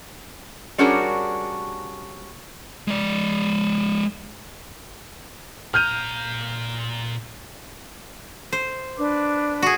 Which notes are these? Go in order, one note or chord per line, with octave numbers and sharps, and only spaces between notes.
G3 C#4 D4 F#4 G#4 A#4
G#3 D5
A#2 A#5 F6 G6 D#7
C5
D4 B4 D6
F#4 G#4